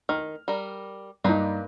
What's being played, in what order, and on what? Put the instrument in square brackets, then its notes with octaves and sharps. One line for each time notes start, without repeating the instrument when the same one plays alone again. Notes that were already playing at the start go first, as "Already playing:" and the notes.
[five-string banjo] D#3 [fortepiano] F6
[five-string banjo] G3 A#4
[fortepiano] G2 D#4 [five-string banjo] A#3 D4 B4